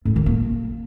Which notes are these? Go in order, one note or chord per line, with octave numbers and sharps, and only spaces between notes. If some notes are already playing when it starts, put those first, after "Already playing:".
A2
D#3
A#3